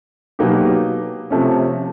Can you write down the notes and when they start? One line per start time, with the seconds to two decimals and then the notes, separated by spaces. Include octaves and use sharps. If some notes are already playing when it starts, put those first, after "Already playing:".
0.39 B2 F#3 A#3 D#4 G4
1.30 C3 F3 A3 C#4